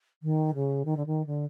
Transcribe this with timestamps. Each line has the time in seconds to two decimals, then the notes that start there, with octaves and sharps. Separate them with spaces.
0.23 D#3
0.55 C#3
0.85 D#3
0.97 D3
1.06 D#3
1.26 D3